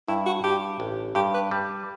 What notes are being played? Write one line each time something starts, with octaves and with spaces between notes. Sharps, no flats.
G2 E4
F#4
G2 G4
A1
G2 G4
B4
G3